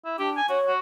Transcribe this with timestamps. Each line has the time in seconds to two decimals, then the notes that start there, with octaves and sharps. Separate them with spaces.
0.05 E4
0.19 D4 G4
0.37 G#5
0.49 F#4 C#5
0.67 F#4